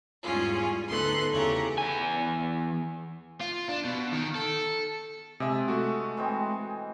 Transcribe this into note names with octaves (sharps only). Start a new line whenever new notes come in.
E2 G#2 G3 C#4 F4 G#4
D2 B3 D#4 A4 C6 F#6
E2 C#3 G4 A4 C#5 A#5
E2 G#5
F4
D4
B2
D#3
A4
C3 G#3 E5
A3 F#4
E3 G#3 C4